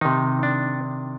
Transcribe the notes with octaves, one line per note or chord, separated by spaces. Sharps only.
C3 D#3 D#4
D4